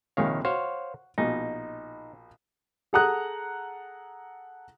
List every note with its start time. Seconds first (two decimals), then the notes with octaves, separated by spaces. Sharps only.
0.17 A#1 C3 D#3 C#5 F5
0.45 F#4 C5 C#5 F5
1.18 A#1 B2 D#4
2.93 G#4 A4 F#5 A#5 D#6 F#6